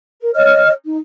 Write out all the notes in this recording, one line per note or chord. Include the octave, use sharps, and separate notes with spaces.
A#4
C#5 D#5 F6
D#4